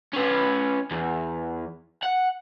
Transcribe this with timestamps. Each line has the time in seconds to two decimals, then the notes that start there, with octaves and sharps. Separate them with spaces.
0.13 C#4 B4
0.91 E2
2.03 F#5